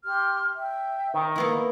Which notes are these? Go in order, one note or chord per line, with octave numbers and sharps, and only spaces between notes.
G4 C6 F6
E5 G5
D#3
A#3 B3 E4